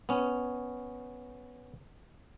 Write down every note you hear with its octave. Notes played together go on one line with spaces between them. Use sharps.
B3 C#4